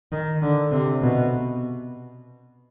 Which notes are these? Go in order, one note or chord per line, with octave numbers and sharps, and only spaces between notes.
D#3
D3
C3
B2